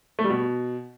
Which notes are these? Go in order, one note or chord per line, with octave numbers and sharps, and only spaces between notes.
A3
G3
B2